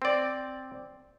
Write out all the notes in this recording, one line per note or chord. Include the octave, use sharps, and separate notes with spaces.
C4 D5